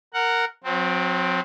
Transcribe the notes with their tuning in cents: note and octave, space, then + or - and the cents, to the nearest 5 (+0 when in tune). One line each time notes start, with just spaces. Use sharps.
A#4 -10 F#5 +0
F#3 -40 C4 -5